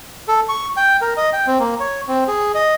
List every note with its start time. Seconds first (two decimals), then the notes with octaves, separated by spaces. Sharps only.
0.28 A4
0.49 C#6
0.77 G5
1.01 A#4
1.17 D#5
1.33 G5
1.47 C4
1.59 A#3
1.80 C#5
2.08 C4
2.28 G#4
2.55 D#5